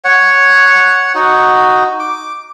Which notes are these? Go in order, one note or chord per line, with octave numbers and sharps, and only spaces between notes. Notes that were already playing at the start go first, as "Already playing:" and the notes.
C#5 F#5
D#4 F#4
D6